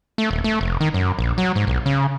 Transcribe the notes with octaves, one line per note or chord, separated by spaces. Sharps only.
A3
D#1
A3
F1
D#3
F#2
A#1
F#3
G#2
B1
C#3